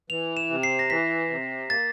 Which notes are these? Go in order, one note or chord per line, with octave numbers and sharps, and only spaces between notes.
E3 F7
E7
C3
C7
A#6
E3 B6
C3
A#3 A6